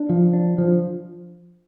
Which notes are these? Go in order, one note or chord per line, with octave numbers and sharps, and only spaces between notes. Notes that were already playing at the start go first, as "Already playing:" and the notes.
Already playing: D4
F3
D4
F3